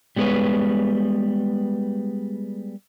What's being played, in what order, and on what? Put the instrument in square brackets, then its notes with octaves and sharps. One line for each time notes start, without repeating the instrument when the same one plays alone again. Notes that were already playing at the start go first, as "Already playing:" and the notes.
[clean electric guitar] G3 G#3 B3 A#4 B4 C#5